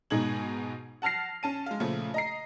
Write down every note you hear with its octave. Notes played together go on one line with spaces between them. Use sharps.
G#2 B2 D#4 G#4 G#6 F#7
F#5 A5 F6 A#6 C7
C#4 A5 D#7
G#3 F5
A#2 C#3 F3 A3
D#5 A#5 C7